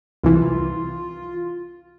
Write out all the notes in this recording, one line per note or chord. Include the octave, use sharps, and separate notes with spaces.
C2 E3 F4